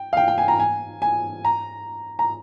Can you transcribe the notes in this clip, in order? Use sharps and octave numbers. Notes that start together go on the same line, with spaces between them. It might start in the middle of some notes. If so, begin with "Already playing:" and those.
Already playing: G5
F5
G5
G5
G#5
A#5
G#5
G#5
A#5
A#5